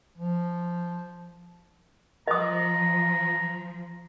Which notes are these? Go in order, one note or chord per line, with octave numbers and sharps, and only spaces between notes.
F3
F3 D#5 A#5 D#6